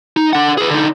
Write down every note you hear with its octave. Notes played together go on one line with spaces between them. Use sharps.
D#4
D4 F#5
G#4 B4
D3 D#4